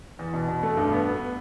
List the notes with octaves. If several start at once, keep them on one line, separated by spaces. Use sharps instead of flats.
E2
B2
B2
A3
G2
B3
B3